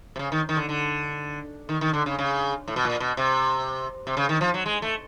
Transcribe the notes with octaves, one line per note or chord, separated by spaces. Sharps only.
C3
C#3
D#3
D#3
D3
D3
D#3
D#3
D3
C#3
C#3
A2
B2
A#2
B2
C3
C3
C#3
D#3
F3
F#3
G#3
A3